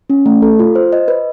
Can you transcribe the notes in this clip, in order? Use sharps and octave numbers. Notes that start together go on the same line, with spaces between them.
C#4
A3
A4
F4
C5
D#5
B4